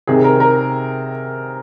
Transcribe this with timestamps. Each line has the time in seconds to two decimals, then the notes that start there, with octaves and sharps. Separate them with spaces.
0.07 C3 D#3 G#4
0.24 A#4
0.40 A#4